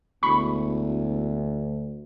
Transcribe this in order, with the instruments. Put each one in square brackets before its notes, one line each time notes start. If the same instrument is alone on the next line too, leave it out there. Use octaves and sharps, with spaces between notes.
[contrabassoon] E1 [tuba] D2 [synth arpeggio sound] B5 C#6